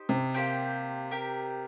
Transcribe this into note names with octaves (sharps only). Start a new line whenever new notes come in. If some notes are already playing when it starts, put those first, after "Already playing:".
Already playing: D#4 G4 C5
C3
A#3 G4 C5 G5
G4 A#4 G5